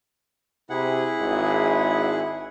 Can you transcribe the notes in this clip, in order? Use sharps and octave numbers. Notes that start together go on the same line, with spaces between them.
C3 E4 G#4 F#5
G#1